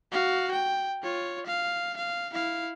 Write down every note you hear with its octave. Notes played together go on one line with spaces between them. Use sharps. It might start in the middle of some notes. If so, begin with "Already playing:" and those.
F#4 F5
G5
F4 C#5
F5
F5
E4 F5